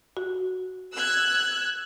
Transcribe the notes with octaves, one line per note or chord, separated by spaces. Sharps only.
F#4
E6 F#6 G#6